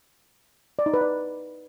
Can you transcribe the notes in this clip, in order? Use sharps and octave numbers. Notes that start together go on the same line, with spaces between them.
D5
D#4
B4
D5